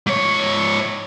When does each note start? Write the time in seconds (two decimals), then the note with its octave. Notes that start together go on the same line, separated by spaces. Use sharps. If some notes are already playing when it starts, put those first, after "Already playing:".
0.06 G#2 C#5